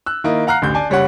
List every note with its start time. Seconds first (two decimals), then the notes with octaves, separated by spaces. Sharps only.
0.06 E6 F#6
0.24 D#3 A#3 E4 D#5
0.47 F5 F#5 A#5 F6 F#6 C7
0.62 A1 D2 G6
0.75 D5 G#5 A5
0.90 F#1 G3 C#4 C#5 F#5 F#6